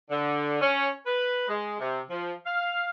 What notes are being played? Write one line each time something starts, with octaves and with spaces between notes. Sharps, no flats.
D3
C#4
B4
G#3
C3
F3
F5